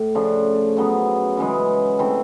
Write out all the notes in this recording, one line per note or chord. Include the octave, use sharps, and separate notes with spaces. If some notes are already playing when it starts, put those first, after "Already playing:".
Already playing: A2
C#3 F3 A3 D4
C#3 F#3 B3
C#3 E3 G#3
E3 A3 C4 E4